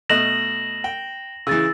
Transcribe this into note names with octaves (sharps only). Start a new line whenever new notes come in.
B2 A3 D#5 A#6 E7 F#7
G5
C#3 E3 E6 A6